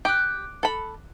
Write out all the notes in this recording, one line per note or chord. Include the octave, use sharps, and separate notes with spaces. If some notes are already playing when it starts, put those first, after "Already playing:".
G4 D6 F#6
A4 B5